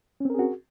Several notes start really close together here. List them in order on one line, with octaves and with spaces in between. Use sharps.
C#4 C4 A#4 G#4 F#4